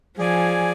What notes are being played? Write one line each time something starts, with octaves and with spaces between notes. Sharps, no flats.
F3 G#4 D5 G#5